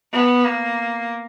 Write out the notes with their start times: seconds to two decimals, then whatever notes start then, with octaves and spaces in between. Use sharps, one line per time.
0.13 B3
0.44 A#3